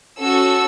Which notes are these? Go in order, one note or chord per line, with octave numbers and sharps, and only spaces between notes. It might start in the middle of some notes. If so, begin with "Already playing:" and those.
C#4 F#4 A4 E6